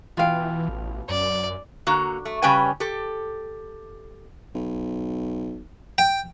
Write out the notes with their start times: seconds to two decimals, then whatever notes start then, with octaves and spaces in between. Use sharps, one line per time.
0.17 B2 E3 F4 F5 G5
0.69 A1
1.09 F#2 D5
1.87 D3 A#3 F#4 A#5
2.25 A3
2.42 C#3 G3 C#4 B4 G5 G#5
2.80 G4 A4
4.55 B1
5.98 G5